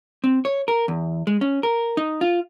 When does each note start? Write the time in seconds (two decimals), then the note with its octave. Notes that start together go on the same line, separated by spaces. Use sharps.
0.24 C4
0.45 C#5
0.68 A#4
0.88 E2
1.27 G#3
1.41 C#4
1.63 A#4
1.97 D#4
2.21 F4